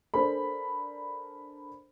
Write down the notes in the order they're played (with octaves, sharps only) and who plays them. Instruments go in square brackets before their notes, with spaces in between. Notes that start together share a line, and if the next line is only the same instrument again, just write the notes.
[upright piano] D4 A4 A#4 C5 G#5 B5